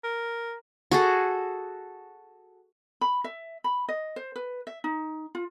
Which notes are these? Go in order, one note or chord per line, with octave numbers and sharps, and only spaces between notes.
A#4
F#4 G#4 A4
B5
E5
B5
D#5
C5
B4
E5
D#4
F4